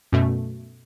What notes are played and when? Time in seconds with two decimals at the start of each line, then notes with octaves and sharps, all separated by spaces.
0.12 F#2 B2 A3